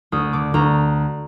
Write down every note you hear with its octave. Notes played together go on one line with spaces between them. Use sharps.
D2 D#6
D3 D6
D2 A#5